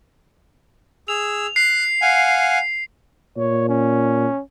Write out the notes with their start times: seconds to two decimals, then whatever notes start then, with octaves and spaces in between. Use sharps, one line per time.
1.08 G#4 E6 F7
1.56 F#6 C7
2.02 F5 F#5 G#5
3.37 A#2 C#5
3.69 C#4